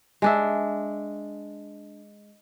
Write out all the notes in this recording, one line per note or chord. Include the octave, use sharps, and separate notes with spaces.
G#3 D4 E5